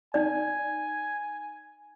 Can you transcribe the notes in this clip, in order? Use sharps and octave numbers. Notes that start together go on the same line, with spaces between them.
D#4 D5 G#5